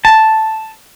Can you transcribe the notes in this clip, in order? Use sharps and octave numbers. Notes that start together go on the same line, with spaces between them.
A5